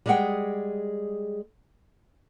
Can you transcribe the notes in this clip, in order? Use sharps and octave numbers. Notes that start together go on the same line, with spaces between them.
G3 G#3 G#4 B4 F#5 G5